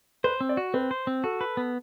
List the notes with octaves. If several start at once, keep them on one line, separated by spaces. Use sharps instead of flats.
B4 C5
C4
D5
F#4
C4 B4
C5
C4
F#4 A4
B4
B3